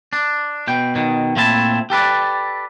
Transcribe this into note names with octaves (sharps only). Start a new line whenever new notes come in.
D4
B2 G5
B2 D#3
A#2 A3 C4 E4 D5 A5
G4 A4 B4 D5